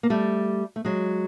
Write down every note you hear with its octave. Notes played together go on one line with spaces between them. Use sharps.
A#3
G3 A3
A3
F#3 G#3